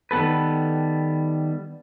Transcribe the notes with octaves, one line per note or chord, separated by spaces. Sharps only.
D#3 G3 B3 A4 B4